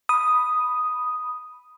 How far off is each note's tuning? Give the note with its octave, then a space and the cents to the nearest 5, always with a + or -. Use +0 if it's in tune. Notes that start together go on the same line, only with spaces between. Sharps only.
B5 +0 D#6 +0